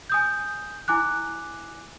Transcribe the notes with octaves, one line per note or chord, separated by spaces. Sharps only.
G#5 D#6 G6
E4 G#5 D6 F#6